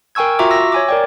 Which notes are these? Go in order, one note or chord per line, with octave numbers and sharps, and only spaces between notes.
A#4 G5 G#5 C#6 E6 G#6
F4 F#4 E5 A#5 C#6 D6
E5 E6 A#6
C#5 G#5 D6
A#4 D5 G5